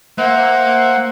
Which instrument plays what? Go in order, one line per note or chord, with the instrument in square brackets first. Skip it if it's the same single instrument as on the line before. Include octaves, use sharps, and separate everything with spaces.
[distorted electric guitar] A#3 [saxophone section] C5 E5 [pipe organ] F#5